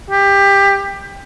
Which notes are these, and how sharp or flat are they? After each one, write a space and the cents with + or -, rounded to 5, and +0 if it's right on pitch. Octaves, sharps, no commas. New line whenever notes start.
G4 +20